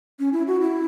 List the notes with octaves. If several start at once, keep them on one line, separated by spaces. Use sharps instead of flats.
C#4
E4
F#4
E4